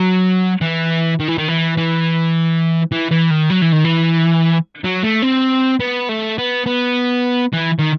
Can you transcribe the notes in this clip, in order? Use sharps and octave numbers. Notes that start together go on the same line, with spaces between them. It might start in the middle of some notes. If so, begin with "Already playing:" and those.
Already playing: F#3
E3
D#3
E3
D#3
E3
E3
E3
E3
D#3
F#3
E3
D#3
E3
F#3
A3
C4
B3
A3
B3
B3
E3
D#3